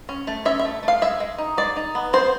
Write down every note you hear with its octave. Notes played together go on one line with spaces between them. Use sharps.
C#4
A3
C#4 E5
E5
A3
A3
F5
G#3 E5
G#3
D#4
G#3 D5
D#4
B3
C4 C5